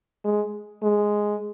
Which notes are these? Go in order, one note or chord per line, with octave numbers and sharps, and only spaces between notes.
G#3
G#3